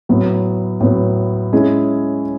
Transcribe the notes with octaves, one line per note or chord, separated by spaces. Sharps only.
A2 F#3 B3
A2 F#3 B3
G#3 C#4 E4 G#4